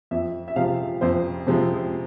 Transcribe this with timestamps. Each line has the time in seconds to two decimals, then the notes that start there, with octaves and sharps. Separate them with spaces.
0.11 F2 E5
0.48 E5
0.56 C3 F3 G#3 F5
1.01 F2 C5
1.47 C3 F3 G#3